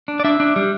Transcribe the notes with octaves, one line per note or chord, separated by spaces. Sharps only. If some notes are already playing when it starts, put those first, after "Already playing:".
D4
D5
D4 E5
D4
G3